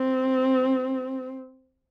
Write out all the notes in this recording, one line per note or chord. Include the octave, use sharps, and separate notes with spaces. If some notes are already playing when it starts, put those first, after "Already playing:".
Already playing: C4